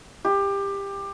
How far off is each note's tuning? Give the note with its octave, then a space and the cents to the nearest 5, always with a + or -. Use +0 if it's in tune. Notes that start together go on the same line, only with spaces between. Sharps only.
G4 +20